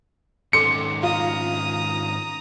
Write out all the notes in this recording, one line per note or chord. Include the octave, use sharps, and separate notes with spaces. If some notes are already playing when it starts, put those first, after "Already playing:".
G#2 D#3 C#4 A4 C6 D6 C#7
F4 A#5 D#6